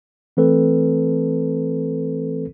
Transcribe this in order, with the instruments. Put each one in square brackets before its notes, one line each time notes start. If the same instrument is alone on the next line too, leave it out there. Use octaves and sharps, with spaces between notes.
[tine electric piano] E3 A3 C4 A4 B4